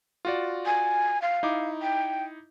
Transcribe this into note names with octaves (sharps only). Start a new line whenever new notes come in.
F4 F#4 D5
G#5
F5
D#4 E4 D6
G5